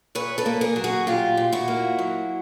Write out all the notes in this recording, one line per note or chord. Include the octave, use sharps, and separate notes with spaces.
A#2 B4 C#5
A4 B4
A#3
G#4 A#4
F#3
F#4 G#4
A#2 F4 G4
A#2
E4 F#4
A#3
F#3